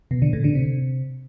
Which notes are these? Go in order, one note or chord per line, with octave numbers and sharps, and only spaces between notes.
B2
D3
A2
D3
C3